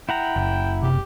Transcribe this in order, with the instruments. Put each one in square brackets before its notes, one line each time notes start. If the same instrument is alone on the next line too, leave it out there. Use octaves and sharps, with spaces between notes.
[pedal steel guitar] E4 F#5 A#5 [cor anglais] G5
[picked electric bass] F#1
[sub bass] C3 [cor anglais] G4